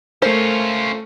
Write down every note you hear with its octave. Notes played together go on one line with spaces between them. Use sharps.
A3 C#4 F4 A#4 C5